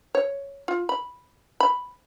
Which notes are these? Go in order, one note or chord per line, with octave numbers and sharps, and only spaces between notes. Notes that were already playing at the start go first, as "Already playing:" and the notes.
C#5
F4
B5
B5